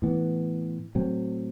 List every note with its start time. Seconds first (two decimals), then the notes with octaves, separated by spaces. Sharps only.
0.02 A2 E3 B3
0.95 A2 F#3 C4